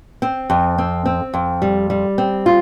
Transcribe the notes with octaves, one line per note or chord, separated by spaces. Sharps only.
C4
F2
C4
C4
F2
G3
G3
C4
F4